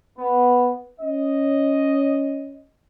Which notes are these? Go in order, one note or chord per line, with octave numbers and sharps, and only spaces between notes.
B3
C#4 D#5